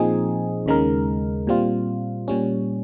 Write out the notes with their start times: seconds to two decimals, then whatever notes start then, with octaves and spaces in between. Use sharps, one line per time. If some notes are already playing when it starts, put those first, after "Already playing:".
Already playing: A#2 F3 C4 D#4 G#4
0.66 D#2 C#3 G#3 D#4 A#4
1.47 A#2 G3 C4 F4
2.28 A#2 G3 C#4